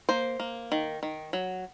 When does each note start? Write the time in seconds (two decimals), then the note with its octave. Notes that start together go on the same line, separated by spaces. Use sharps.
0.09 A#3 C5
0.40 A#3
0.72 D#3
1.03 D#3
1.33 F#3